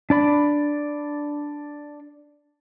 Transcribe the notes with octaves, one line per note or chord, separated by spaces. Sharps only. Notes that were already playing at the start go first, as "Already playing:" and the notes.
D4 D5 B5